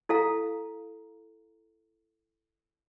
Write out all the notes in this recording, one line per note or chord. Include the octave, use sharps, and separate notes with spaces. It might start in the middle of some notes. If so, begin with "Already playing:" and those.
E4 A4 F5 A#5